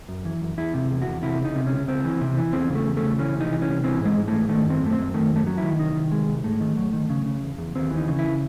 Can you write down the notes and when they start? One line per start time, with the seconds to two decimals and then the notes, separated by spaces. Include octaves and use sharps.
0.09 F#2
0.25 E3
0.42 F#2
0.58 E2 E4
0.74 C3
0.90 E2
1.02 F#4
1.07 E2
1.23 C3 E4
1.40 C#2 D#4
1.56 C3
1.67 C#4
1.72 C#2
1.88 C#2 C4
2.04 E3
2.21 C3
2.37 E3
2.53 E2 C4
2.69 C#3
2.75 A3
2.86 E2
2.97 A3
3.03 C#3
3.19 E3 C#4
3.35 C2
3.40 D#4
3.52 E3
3.62 C#4
3.68 C2
3.83 E3 C4
4.00 G#2
4.05 G#3
4.16 G#2
4.28 E3 A3
4.49 D#3 A3
4.65 F#2
4.70 C4
4.81 F#2 A3
4.92 C4
4.98 F#2
5.14 D#3 A3
5.30 F#2
5.36 A3
5.46 F#3
5.58 E4
5.63 D#3
5.79 C2 D#4
5.95 D#3
6.12 C2 G#3
6.28 C2
6.44 G#2 A3
6.61 D#3
6.77 F#3
6.93 D#3
7.10 C#3
7.26 C#3
7.42 E2
7.58 E2
7.75 D#2 C4
7.91 E3
7.96 D#4
8.08 C#3
8.19 E4